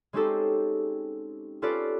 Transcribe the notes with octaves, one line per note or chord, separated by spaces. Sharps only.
G#3 C4 C#4 D#4 G4 A4
C#4 F4 G4 A4 B4 D5